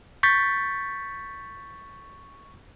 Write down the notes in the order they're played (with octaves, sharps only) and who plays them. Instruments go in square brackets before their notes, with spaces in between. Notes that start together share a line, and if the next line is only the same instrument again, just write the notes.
[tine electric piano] C#6 G6 A6 B6